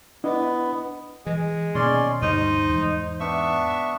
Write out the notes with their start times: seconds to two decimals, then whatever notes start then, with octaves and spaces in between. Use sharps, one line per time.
0.24 B3 D4 E4 D#5
1.27 E3 G#3
1.75 B2 D#3 A#3 C#4 D5 C6
2.22 D2 G2 C3 D#4 C5
2.69 E2 G#2
3.20 B3 D4 E5 C#6